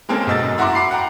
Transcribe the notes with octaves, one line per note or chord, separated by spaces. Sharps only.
G#3 A#3 C4 C#4 A4
G#2 B2 D#5 E6 A6
F#2
E4 F#4 F#5 A#5 C6 D6
F#5 A#5 B5 D6 C7
F#5 G5 A#5 D6